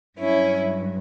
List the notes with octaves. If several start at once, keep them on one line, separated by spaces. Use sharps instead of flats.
G2 F#3 C#4 E4